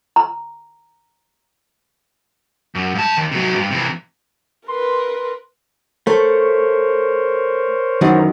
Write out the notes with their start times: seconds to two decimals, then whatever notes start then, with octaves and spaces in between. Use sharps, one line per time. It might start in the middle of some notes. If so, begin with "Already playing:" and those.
0.16 A#5
2.75 F#2
2.95 G2 A5
3.17 D#2
3.31 C3 F#3
3.54 C#2 G2
3.71 C3 E3
4.68 A#4 B4 C6
6.07 A3 A#4 C5 C#5
8.01 F#2 D#3 E3